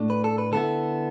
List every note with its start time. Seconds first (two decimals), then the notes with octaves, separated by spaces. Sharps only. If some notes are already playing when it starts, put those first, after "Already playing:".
Already playing: A2 A3 D4
0.10 B4
0.24 A4
0.38 B4
0.52 D3 B3 E4 A4